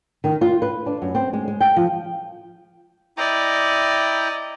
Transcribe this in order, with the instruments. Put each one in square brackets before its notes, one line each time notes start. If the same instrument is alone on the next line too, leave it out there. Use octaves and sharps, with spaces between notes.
[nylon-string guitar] D#3
F4
B4
D4
F#2
C4
G#3
G#3
G5
F3
[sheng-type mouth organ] E4 G5 A#5 [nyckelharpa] D5 D#5